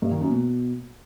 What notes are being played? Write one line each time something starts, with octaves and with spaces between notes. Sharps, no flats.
G2
D#3
F#2
B2